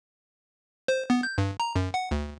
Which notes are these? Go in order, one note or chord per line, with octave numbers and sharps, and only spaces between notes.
C5
B3
G6
G2
A#5
F#2
F#5
D2